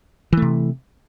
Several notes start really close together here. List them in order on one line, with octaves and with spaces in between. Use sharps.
E3 A3 C3